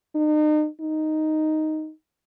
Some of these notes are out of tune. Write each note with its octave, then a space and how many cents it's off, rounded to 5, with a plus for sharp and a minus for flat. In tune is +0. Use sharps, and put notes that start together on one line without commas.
D#4 -40
D#4 +0